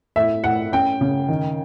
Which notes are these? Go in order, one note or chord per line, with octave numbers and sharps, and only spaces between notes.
A2 E5
A2 F#5
C#4 G5
C#3
D#3